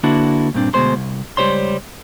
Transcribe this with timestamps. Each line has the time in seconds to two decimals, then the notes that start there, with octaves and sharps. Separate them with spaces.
0.03 D3 A#3 D4 E4 F#4 B4
0.54 G2 A#2 C4 D4
0.74 D2 B2 G#3 C5 C6
0.96 C2
1.37 C#2 C#3 G3 C5 C#5 C6